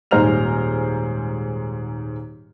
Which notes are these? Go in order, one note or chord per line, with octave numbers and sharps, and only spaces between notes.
D#1 G#2 C5 A#5 F6 F7